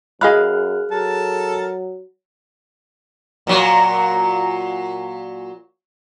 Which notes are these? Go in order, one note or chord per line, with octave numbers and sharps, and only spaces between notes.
F#2 G#4 D#5 F5 B5 F6 F#6
F#3 A4 A#4 A5
A#2 F#3